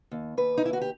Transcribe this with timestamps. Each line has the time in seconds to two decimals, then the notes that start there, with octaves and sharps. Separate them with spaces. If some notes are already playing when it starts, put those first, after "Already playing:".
0.11 D#2
0.37 D#2 B4
0.57 D#4
0.64 D#2 E4
0.73 F#4
0.81 G4